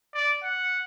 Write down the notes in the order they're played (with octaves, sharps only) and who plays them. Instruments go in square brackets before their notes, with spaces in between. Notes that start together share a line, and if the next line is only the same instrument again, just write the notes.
[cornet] D5
F#5